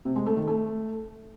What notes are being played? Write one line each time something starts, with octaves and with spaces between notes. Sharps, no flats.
C3
G#3
A3
D#3
A3